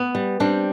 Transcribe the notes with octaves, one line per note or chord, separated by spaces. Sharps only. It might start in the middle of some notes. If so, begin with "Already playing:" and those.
Already playing: B3
G3
G3 C4 D4